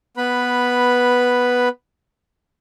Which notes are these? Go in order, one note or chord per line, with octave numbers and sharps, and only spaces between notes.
B3 B4 B5